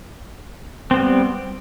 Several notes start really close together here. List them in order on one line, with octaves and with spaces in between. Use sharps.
C4 B3 G3